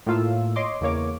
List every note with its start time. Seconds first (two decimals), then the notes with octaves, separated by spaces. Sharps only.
0.07 A2 A#3 F4 F5 E6
0.56 C#5 D#5 C6 D6
0.81 E2 C#3 A#3 C#5 D6